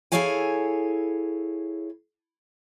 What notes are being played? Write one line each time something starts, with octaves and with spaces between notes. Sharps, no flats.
E4 G#4 A4 C#5 F5 G#5